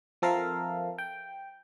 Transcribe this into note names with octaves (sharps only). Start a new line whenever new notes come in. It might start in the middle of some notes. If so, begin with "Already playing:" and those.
F3 C4 A4 A#4 E5 F5
G5